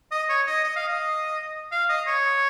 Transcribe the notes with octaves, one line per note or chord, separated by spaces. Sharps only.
D#5
C#5
D#5
D#5
F5
D#5
F5
D#5
C#5